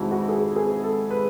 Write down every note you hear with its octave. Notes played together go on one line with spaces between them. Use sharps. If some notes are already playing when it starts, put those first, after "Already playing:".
Already playing: F2 C3 D#3 G#3 E4 F#4
F#4
G#4
G#4
A4
B4